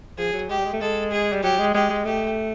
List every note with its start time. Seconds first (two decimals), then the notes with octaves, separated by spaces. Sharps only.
0.18 F3 G#4
0.33 F#3
0.49 G#3 G4
0.59 G3
0.65 G#3
0.73 A3
0.81 G#3 A4
1.11 G#4
1.32 G3
1.43 F#3 G4
1.58 G#3
1.74 G#3 G4
1.90 G#3
2.05 A3 G4